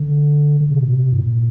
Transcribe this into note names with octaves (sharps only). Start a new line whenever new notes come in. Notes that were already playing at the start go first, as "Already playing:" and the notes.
Already playing: D3
D3
C3
A#2
C3
G2
A#2